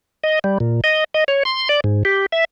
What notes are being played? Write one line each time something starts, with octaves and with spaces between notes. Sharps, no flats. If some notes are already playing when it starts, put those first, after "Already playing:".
D#5
G3
A#2
D#5
D#5
C#5
C6
D5
G#2
G4
E5